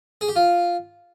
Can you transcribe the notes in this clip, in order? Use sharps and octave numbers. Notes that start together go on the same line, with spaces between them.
G#4
G4
F4